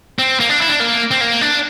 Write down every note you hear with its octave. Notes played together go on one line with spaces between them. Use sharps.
C4
A#3
D4
E4
D4
A#3
C4
A#3
D4